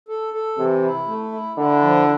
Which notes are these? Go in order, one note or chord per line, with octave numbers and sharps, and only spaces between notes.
A4
A4
C3 E3
E4
A3
E4
D3 E4
F3